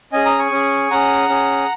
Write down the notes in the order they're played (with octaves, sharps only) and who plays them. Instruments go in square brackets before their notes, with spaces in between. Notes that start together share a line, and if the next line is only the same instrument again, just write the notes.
[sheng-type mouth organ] C#4 G#4 D#5 G#5
A#5 D#6
G#5 C#6
C#4 G#4
C#4 G#4 F#5 A#5
C#4 G#4